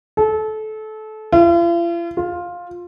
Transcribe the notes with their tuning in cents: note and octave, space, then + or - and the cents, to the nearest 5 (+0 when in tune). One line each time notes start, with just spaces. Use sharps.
A4 -25
F4 -45
F4 +10